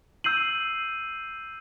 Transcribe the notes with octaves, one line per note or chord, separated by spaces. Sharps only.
E6 G6 C7 D#7 F#7